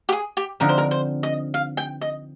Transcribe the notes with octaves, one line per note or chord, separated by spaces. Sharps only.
G4
G#4
G4
D3 F3 C4 D#4 A#4
C5
A#4
C5
D#5
F5
G5
D#5